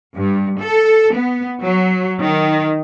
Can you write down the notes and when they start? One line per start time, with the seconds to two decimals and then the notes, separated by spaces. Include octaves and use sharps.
0.16 G2
0.60 A4
1.14 B3
1.63 F#3
2.22 D#3